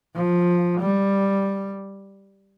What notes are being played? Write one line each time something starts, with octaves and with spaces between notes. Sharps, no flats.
F3
G3